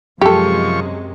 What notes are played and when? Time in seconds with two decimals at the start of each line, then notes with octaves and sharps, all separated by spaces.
0.21 F#2 C3 F3 G#3 G4 A4 C#6